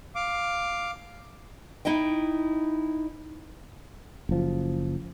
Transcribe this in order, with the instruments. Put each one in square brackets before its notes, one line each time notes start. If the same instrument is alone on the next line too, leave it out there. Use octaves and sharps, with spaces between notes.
[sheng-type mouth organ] F5 D6
[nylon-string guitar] D#4 E4 D#5 G5
[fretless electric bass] F#1 F3